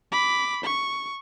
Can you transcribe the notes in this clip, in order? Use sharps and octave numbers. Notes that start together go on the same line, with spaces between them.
B5 D6
C#6